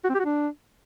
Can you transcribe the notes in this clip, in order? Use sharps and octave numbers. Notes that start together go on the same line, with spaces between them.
F#4
C4
G4
F#4
D4